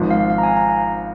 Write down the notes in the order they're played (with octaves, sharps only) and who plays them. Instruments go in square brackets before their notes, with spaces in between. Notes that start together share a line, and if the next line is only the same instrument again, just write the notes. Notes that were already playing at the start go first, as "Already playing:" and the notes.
Already playing: [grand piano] G#1 G#2 F3
[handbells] F5
F5
A#5
G#5
A#5
F5